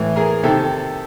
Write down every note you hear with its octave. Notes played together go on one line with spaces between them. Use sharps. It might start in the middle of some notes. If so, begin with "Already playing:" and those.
Already playing: A2 E3
G#4 A#4
C3 D#3 G4 A4